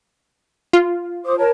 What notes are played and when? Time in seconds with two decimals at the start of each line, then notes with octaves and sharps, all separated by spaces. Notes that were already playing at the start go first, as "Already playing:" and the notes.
0.73 F4
1.25 C5 D6 D#6
1.39 A#4 C#5 A5